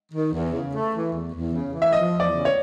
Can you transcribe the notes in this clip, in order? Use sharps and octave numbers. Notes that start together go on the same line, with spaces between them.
D#3
E2
C#3
A3
E3
E2
E2
C#3
E3
E5
F3 D#5
E2
D5
C#3
C#5